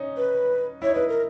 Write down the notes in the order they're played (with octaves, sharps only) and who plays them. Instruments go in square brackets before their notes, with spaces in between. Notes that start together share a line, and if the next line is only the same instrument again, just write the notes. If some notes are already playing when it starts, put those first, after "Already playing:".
Already playing: [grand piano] C#4 D#4
[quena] B4
[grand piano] E4 [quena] C#5
[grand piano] D#4
[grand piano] E4 [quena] B4
[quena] A#4